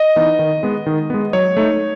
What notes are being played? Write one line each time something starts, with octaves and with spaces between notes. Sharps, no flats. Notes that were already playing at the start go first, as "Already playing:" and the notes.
Already playing: D#5
E3 B3 D#4
D#3
G#3 B3
D#3
G#3 B3
F#3 C#5
A3 D#4